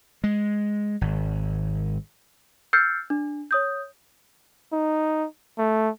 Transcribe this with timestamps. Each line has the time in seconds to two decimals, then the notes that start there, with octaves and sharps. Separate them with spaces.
0.24 G#3
1.01 G#1
2.73 E6 F6 G6 A6 C7 C#7
3.10 D4
3.51 C#5 D#6 G6
4.73 D#4
5.59 A3